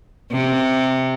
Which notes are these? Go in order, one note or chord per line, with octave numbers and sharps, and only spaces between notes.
C3